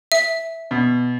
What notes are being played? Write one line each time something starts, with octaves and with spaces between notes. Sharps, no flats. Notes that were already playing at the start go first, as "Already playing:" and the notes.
E5
B2